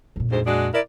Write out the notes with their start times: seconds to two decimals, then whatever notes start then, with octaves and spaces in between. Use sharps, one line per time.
0.16 F2 A#2
0.32 D2 G#2 C5
0.47 G#3 D4 F#4
0.74 E4 A#4 D5